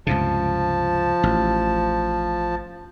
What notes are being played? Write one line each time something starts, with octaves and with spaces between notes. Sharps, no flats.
C#2 G2 C3 F3 A5
A1